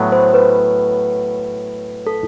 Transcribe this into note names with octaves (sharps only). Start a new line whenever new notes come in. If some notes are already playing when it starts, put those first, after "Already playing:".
Already playing: A2 F#3 B3
C5
B4
A4